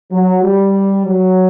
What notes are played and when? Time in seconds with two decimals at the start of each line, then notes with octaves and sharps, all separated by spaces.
0.12 F#3
0.43 G3
1.06 F#3